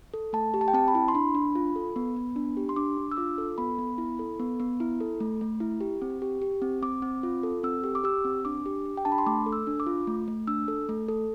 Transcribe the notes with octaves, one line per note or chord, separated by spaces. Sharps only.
A4
A3 A5
G4
A5
G5
C4 A5
B5
E4
C6
D4 B5
D4
F4
A4
B3
B3
D4
G4
C6
D4 D6
D4
E6
F4 D6
A4
B3 B5
B3
E4
A4
B3
B3
E4
A4
A3
A3
E4
G4
C4
G4
G4
C4
C4 D6
C4
F4
A4
C4 E6
G4
D6
G4 E6
C4
D4 D6
G4
G4
G5
D4 A5
B5
C6
A3 D6
A4
E6
D4
D6
F4
A3
A3
D4 E6
A4
A3
A4